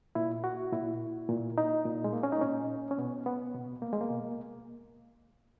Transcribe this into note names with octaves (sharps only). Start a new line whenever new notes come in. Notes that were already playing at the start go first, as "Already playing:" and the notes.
A#2 E4
F#4
A#2 E4
A#2
D#4
A#2
G#3
A#3
C#4
D#4
A#2 C#4
C#4
B2 B3
B3
B2
A#3
G#3
A#3
B2